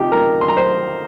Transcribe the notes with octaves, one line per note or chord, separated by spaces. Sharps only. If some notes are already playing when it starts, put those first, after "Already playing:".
Already playing: C3 F3 D#4 G4 G5
A#4 A#5
C6
A#5
C5 C6